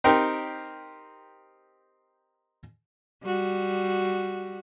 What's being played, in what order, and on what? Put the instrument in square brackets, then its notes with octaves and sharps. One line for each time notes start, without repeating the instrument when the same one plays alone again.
[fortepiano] C4 D#4 G4 A#4
[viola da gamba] G3 F#4